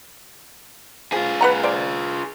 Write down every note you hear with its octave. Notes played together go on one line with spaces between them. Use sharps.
F3 F4 G#4
B4 F#5 A#5
C5 D5